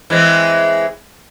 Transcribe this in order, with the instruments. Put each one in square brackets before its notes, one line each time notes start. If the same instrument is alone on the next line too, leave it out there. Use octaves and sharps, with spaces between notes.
[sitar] E3 G#3 C4